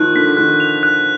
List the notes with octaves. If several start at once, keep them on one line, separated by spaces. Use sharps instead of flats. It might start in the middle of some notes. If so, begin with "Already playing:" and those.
Already playing: D#3 F3 F#6
D3 B6
D#3 F#6
F7
F#6